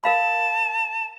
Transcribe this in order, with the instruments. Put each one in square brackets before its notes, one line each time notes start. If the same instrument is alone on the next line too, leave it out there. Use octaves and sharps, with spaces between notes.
[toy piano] A#4 F5 B5 [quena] A5